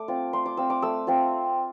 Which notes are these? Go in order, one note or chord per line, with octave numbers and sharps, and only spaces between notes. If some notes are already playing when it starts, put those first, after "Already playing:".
Already playing: A3 D6
C4 F4
A3 C6
D6
C4 F4 E6
D6
A3 E6
C4 F4